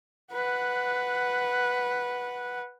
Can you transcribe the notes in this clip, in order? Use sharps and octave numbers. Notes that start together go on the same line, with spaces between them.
B4 F#5